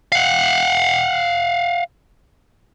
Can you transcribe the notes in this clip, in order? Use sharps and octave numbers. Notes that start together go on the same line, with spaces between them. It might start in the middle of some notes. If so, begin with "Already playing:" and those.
F5 F#5